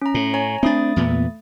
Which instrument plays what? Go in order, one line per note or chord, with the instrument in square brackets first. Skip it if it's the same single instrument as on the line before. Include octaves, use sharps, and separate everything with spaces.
[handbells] C#4 A#5
[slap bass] A2
[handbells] C#5 G#5 A#5
[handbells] A3 D#6 A6 [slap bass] C4 D4
[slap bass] E2 A#2 B3